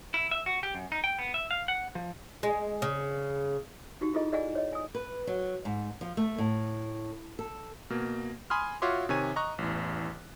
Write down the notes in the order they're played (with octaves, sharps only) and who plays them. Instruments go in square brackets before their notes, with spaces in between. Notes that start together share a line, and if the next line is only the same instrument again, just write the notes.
[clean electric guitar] E4
E5
F#4
G4
F#2
D#4
G5
B3
E5
F5
F#5
F3
[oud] G#3
C#3
[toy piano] D#4 F#4 G4
E4 F4 G#4 A4 D#5
G#4 D5 D#5 F#5 G#5
C#5 D#5
G#5 D#6
[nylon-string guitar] B4
F#3
G#2
F3
A3
A2
A4
[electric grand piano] B2 A#3
G#5 B5 C6 D#6 F6
F4 F#4 C#5 E5 C6 D6
C3 D#3 C#5 G#5 D#7
D#5 A#5 C#6 F#6
A1 E2